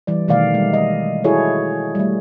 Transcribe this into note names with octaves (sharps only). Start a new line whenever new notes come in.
E3 G3 D5
B2 D#3 A3 D5 F5
G3 G#3
D#5
E4 F#4 G#4 A4 C#5
G3 A3